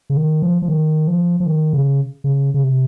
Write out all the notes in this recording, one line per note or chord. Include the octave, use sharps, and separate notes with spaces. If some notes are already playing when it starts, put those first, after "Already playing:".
C#3
D#3
F3
F3
D#3
F3
F3
D#3
C#3
C#3
C#3
C3